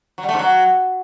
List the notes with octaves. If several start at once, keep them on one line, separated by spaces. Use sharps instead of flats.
F#3
G3
A3
G#2
F#3